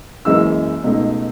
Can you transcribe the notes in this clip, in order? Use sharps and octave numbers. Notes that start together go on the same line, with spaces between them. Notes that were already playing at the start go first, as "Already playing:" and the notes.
F#1 F#2 E3 G#3 E6
C#2 B2 A3 D#4